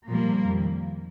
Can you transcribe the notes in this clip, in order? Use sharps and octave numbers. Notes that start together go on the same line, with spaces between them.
A#2 F3 G3 A#3
F2 D#3